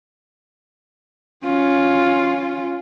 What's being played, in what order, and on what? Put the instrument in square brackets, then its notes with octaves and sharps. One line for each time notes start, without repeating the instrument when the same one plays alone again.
[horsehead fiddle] C#4 F4